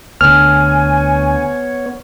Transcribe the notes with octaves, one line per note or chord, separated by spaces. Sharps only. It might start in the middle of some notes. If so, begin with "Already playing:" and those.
D2 D3 B3 C#5 G#5 F6